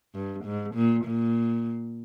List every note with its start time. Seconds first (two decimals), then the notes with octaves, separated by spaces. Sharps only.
0.15 G2
0.45 G#2
0.75 A#2
1.05 A#2